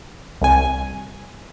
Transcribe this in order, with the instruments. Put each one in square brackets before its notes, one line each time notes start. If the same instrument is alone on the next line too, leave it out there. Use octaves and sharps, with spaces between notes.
[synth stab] C2 G#5